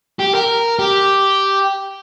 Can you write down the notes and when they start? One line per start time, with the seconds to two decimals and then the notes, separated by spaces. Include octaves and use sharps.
0.20 G4
0.35 A#4
0.79 G4